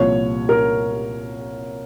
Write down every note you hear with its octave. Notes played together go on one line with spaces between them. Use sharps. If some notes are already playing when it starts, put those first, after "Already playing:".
Already playing: C2 A#2 F3 C#5
A#4